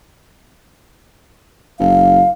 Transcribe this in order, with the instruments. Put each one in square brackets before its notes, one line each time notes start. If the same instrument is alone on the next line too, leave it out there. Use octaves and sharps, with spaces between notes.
[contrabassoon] F#1 [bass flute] F5